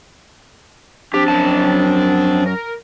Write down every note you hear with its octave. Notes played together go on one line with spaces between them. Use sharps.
F3 C4 D4 G4
F#2 A5
A#4